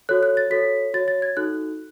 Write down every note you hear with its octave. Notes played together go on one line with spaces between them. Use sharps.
F#4 A4 C#5 F#6
F#6
A6
F#4 A4 C#5 B6
F#4 C#5 A6
A6
G#6
D#4 F#4 A4 F#6